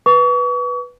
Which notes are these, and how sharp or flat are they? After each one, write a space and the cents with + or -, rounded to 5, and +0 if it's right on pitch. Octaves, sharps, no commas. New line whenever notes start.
B4 -5 C#6 +40